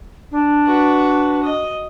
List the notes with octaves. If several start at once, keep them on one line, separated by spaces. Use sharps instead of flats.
D4
F#4 B4
D#5